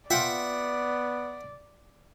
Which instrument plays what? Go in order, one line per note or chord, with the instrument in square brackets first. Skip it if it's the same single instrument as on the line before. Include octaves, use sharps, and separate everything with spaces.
[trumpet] B3 [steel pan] F4 G5 [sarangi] D5 [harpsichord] E5 F#5